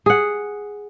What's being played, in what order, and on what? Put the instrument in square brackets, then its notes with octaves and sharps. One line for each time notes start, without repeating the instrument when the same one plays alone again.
[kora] G#4 F#5